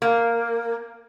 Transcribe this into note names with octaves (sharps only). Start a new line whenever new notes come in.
A#3